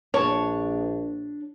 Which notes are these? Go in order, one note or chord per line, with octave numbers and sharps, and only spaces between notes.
A#1 D4 C#5 A5